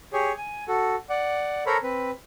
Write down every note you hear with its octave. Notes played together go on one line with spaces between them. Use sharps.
G4 G#4 C#5
G#5
F#4 A4
D5 F#5
A4 A#4 C5 C#5 A#5 B5
C4 B4